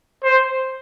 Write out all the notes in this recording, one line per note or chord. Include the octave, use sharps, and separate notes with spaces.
C5